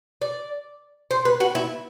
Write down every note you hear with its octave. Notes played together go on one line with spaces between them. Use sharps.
D5
C5
B4
F#4
E4